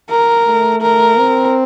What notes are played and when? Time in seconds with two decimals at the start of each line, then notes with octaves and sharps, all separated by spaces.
0.10 A#4
0.46 A3
0.82 A#4
1.19 C4